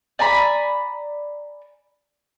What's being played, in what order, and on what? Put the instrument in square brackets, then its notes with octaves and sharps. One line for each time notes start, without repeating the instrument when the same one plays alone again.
[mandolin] D5 G#5 A#5 B5